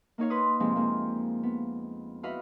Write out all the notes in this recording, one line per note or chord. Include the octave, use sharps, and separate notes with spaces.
A#3 D#4 C#5 F5
B4 C6 D#6
F2 C3 F3 G#3 A#3 C4
F3 G#3 A#3
B3
E4 F#4 B4 D#5 F5 B5